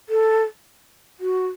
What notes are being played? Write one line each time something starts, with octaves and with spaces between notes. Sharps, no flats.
A4
F#4